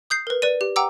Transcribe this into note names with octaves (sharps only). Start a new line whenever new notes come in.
D#6 G6 C7
A#4 B4
B4 D5 D#7
G4
F#5 G5 A#5 D6 E6